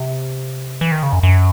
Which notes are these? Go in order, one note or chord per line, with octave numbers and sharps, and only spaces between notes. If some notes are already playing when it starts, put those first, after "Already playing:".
Already playing: C3
E3
D#3
C#3
F#2
F#2